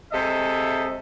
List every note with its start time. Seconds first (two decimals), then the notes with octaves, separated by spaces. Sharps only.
0.12 C3 G#3 A4 D#5 E5